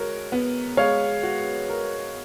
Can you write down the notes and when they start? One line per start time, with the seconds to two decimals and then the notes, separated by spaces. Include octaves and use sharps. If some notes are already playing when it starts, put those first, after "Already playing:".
Already playing: G#3 F#4 A#4 C#5
0.32 B3
0.77 G#3 C#5 F5
1.23 F#4
1.69 A#4